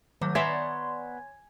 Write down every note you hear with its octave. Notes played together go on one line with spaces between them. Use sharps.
D#3 F#3 A3 D6 G6
B3 C#5 D5 E5 G#5 A#5 C6 G#6